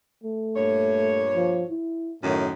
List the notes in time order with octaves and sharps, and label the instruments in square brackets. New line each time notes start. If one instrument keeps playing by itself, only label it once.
[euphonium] A3
[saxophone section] G2 A#2 C#5
[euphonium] F3
E4
[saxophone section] F#2 D#3 [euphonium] A2